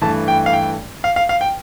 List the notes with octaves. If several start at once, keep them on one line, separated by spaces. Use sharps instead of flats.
G2 E3 A3 A5
G5
F5
G5
F5
F5
F5
G5